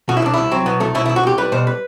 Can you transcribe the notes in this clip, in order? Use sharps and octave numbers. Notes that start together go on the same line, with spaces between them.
B2 F#4
E4
C2 D4
C2 E4
F#3 C4
B2 B3
C2 A3
B2 E4
C2 E4
F#4
C2 G4
G3 B4
B2 C5
B4